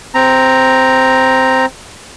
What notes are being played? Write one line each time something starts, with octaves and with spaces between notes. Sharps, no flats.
C4 A#5